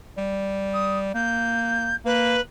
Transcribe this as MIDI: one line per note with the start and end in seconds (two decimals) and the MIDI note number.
0.18 1.12 55
0.74 0.98 87
1.15 1.93 58
1.15 1.96 91
2.05 2.38 58
2.05 2.40 71